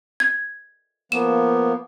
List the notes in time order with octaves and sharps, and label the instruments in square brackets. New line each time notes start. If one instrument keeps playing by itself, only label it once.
[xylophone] G#6
[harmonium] F3 A#3 B3 [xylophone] E7